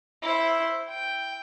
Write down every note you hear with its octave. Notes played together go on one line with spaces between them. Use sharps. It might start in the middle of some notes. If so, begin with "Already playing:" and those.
E4 C5
G5